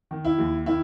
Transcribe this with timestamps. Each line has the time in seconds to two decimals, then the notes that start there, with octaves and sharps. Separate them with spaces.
0.11 D#3
0.25 E4
0.38 D#2
0.66 D#3 E4